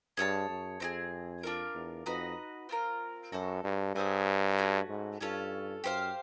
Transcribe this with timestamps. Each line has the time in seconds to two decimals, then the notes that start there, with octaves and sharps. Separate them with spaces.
0.17 G2 G#4 C#5 F5 A5
0.49 F#2
0.80 F2 C4 D#4 G#4
1.43 D4 F4 A#4
1.75 E2
2.06 F2 D#4 F#4 B4 D#5
2.69 C4 F4 A#4
3.32 F#2 F#4 A4 C5
3.64 G2
3.95 G2 G#4 C5 E5 G#5
4.58 A3 C#4 F#4
4.89 G#2
5.21 G2 C#4 F4 A4
5.84 F#2 G4 C5 F5